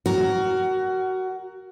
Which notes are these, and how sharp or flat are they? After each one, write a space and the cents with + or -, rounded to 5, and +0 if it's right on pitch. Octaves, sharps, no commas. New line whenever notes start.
F#4 +20 A#4 +0